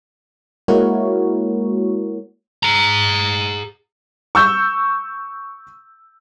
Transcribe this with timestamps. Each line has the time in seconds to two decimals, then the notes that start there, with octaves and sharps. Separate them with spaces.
0.68 G#3 A#3 E4 F#4 A#4 C#5
2.63 G#4 A#5
4.35 C#6 E6 G6